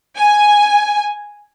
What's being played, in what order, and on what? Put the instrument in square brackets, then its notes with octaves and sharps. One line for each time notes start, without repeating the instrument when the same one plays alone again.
[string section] G#5